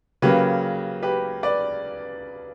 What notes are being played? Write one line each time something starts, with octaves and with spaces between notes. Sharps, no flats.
C#3 F#3 A#3 G4 B4
G4 B4
B4 D5